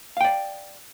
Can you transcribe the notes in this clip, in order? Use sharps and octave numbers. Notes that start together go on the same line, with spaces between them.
D5 F5 G5